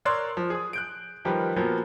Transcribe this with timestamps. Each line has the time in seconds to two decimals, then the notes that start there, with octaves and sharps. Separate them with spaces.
0.05 A#4 C#5 D5 C6 E6 F#6
0.37 F3
0.50 G#4 D#6
0.73 F#6 G6 D7
1.25 D#3 F3 G3 G4 A#4 B4
1.56 A#2 F3 F#3 A#3 B3